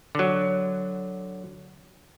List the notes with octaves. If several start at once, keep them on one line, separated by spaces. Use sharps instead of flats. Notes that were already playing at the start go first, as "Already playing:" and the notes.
D3 F#3